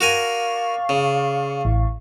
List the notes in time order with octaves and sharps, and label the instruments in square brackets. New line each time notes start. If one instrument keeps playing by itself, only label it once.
[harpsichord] F#4 A#4 G#5 [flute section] D5 F5 C#6
[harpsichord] C#3
[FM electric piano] A1